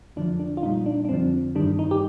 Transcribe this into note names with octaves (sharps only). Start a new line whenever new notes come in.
F2 D3 F3 D4
D4
F4
A#2 G3 D#4
D4
D4
F2 D3 F3 C4
G2 D#3 G3 D4
D#4
G4